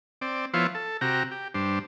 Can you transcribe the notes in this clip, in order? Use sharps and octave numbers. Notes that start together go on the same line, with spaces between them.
C4 D5
F3 B3 E4 F4 C5 C#5
A4
C3 F#4 G4 A#5
G4
G2 D4 C5